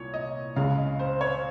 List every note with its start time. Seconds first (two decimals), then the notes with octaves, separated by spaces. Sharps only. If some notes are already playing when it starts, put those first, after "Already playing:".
Already playing: C2 A#2 C#5
0.14 D#5
0.56 C#2 C#3 G#3 F5
0.78 D#5
0.99 C5
1.21 C#5